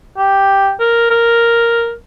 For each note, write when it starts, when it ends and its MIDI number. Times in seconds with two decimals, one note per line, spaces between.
0.17 0.70 67
0.80 1.08 70
1.10 1.92 70